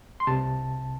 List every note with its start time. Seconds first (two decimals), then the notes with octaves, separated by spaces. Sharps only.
0.20 C6
0.27 C2 C3 A5